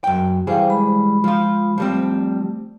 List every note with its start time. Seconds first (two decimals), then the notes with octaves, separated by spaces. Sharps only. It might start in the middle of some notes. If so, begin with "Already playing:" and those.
0.04 F#2 G5
0.47 E3 G3 G#4 C5 F5 G5
0.69 G#3 B5
1.24 F3 F4
1.78 F3 G3 A3 C4